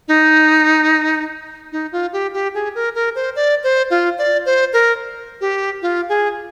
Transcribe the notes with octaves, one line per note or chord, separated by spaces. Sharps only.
D#4
D#4
F4
G4
G4
G#4
A#4
A#4
C5
D5
C5
F4
D5
C5
A#4
G4
F4
G#4